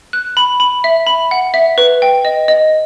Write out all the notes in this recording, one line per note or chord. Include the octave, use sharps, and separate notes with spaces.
F#6
B5
B5
E5
B5
F#5
E5
B4
G5
D#5
D#5